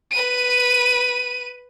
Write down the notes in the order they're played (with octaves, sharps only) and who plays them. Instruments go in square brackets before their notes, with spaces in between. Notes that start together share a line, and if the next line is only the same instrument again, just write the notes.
[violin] B4 D#7